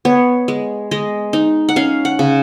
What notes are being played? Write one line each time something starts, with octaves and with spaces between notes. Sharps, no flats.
B3 C#5
G#3
G#3 D#5
D#4
F#5
C#4 F5
F#5
C#3